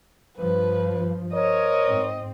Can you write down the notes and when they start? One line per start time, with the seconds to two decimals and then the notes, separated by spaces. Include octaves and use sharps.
0.38 G2 F3 B4
1.33 A#4 C5 C#5 D#5
1.88 G#2 C4